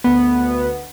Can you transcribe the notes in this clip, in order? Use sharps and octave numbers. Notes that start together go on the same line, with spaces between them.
D2 B3